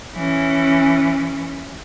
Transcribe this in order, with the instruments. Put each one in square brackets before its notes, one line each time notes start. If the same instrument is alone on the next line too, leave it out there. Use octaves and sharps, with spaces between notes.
[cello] E3 C#4